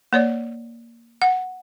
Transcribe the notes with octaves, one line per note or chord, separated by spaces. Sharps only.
A#3 C#5 D5
F#5